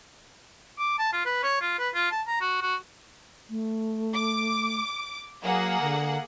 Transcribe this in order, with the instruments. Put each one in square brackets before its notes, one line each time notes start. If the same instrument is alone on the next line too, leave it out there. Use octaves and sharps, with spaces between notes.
[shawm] D6
A5
F4
B4
C#5
F4
B4
F4
A5
A#5
F#4
F#4
[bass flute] A3
[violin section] D6
[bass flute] F#3 [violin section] A#3 G#4 F#5
[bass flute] D3